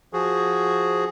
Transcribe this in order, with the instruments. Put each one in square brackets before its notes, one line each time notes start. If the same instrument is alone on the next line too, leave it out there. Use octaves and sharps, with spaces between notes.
[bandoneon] F3 F#4 G#4